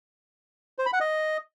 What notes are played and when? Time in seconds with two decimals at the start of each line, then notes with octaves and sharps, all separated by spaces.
0.79 C5
0.86 B5
0.93 F#5
1.00 D#5